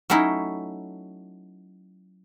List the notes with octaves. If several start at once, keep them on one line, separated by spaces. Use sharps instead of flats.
F#3 A3 C#4 D#4 E4